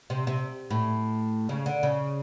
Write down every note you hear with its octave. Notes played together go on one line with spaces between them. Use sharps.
C3
C3
A2
C#3
D3
C#3